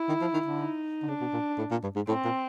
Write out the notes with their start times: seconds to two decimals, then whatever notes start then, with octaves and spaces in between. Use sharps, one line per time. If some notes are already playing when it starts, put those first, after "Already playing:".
Already playing: E4
0.09 D#3
0.21 F3
0.34 D#3
0.46 D3
0.58 D#4
1.02 D3
1.08 C#3 D4
1.21 B2
1.33 A#2
1.58 A2
1.71 A#2
1.83 G2
1.96 G#2
2.08 A2 C4
2.24 A#2